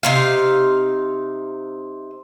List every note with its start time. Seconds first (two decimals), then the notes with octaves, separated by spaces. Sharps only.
0.03 C3 D#4 F5